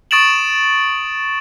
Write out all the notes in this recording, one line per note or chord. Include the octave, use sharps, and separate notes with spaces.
C#6 D#6 A6 D7 E7 F#7